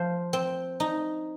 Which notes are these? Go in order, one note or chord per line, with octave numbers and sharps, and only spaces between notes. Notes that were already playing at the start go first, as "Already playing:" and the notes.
Already playing: F3 C5
C4
D#4